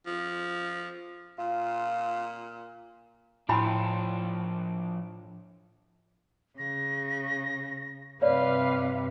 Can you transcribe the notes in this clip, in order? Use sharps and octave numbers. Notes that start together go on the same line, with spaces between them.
F3
A#2 F4
A2 F3 D4 E4 G5 G#5 B5 C6
C#3 A#6
G2 C3 B4 C#5 D5 F5 F6